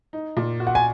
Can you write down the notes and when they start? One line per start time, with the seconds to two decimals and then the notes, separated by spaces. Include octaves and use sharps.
0.13 D#4
0.37 A#2
0.60 F#4
0.67 F#5
0.75 G#5